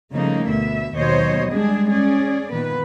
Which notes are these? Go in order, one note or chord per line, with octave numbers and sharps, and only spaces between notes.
C#3 F3 G3 A3 A#3 D#4
D2 B2 E5
D#2 B2 F#3 C5 C#5 D#5
G3 G#3 D4 G#4
C#4 G#4 D5
A#2 D#3 B3 B4